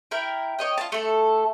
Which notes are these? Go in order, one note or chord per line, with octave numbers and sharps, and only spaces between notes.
E4 A#4 G5
C#5 D#5 G5
F4 A5
A3 A4